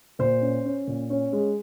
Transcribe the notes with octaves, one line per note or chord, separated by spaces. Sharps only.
A#2 C5
C#4
C#4
A#2
C#4
G#3